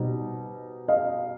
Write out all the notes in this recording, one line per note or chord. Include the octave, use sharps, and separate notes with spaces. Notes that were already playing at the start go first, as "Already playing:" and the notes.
Already playing: B2 G3 C4 D#4
D#5 F5